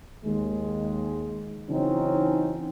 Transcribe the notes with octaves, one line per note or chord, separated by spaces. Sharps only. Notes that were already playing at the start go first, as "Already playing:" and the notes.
D#2 G#3
C#3 E3 F#3 C4 C#4 D#4